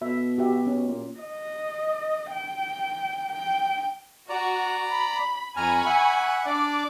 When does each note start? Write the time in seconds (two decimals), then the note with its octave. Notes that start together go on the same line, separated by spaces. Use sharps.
0.02 B2 E5
0.38 F#4 G4 E5
0.67 C#4
0.88 A#2
1.20 D#5
2.31 G5
3.32 G5
4.29 F#4 D5 A#5
4.89 B5
5.57 F2 G#5 A#5 B5 C#6 F6
5.86 E5 F#5
6.46 D4 D5 D6